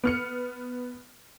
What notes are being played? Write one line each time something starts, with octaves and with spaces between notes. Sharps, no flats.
B3 F6 C#7